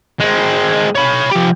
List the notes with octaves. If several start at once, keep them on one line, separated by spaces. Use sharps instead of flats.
G#3 C4
C#5 B5
F3 G4